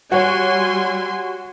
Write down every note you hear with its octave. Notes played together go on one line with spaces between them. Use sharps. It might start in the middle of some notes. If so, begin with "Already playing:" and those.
G3 F#4 C#5 G#5 C6